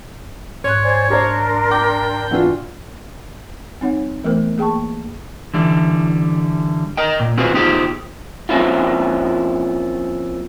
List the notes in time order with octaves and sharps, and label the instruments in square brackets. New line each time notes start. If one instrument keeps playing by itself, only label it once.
[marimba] G#2 F#6 [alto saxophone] C#5 [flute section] C6
[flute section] C5 D5 G#5
[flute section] D4 A#4 C6 [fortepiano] G4 C5
[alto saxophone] G5 [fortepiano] D6
[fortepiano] E3 D4 F4 [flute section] F#4
[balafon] G3 C4 D#4 C#5 F#5
E3 A3 B3 A#4 C5
A#3 G#4 G5 A5 C#6
[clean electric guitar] D3 E3 G3
A#4 D#5 G5
A#2
C4 F4 F#4 G#4 B4 C5
B3 D#4 F4 G4 G#4 C5
F3 A#3 C4 C#4 E4 F4